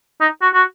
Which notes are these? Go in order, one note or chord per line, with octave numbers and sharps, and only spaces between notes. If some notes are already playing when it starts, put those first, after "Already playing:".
D#4
F#4
F#4